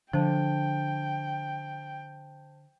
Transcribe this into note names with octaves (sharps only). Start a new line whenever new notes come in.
D3 F3 C5 G5 A5